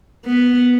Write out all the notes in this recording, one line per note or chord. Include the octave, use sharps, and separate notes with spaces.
B3